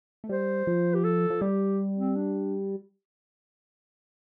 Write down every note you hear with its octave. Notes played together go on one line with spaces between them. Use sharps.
A3
G3 C5
F3
G4
A4
F3
G3 G4
C4
D4